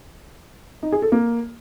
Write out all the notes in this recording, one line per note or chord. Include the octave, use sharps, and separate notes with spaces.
D#4
G#4
A4
A#3